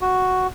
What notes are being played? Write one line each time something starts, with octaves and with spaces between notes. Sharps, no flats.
F#4